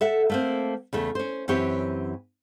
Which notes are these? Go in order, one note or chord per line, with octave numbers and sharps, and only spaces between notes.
A4 E5 F#5
A3 A#3 C4
E2 C#3 A3
C#4 C5
F#2 E3 C4 G4 C#5